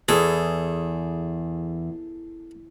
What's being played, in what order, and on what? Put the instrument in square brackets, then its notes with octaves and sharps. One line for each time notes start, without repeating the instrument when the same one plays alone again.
[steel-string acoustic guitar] E2 [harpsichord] G#4 A4